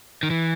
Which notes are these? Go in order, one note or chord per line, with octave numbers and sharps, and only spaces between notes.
D#3
E3